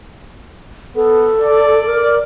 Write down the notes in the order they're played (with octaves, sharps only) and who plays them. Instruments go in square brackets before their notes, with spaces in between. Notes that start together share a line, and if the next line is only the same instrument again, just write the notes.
[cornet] B3 [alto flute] A4
[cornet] D5
[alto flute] A#4